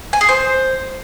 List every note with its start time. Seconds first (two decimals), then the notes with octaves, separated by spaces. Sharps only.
0.13 G#5
0.21 G#4
0.29 C5